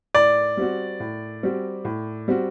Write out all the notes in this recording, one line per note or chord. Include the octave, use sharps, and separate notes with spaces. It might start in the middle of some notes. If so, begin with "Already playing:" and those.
A2 D5
G3 C4 F#4
A2
G3 C4 F#4
A2
G3 C4 F#4